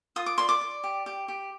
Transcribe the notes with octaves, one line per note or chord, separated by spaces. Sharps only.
F4 D#6
D6
D5 C6
D6
D5
G4
G4
G4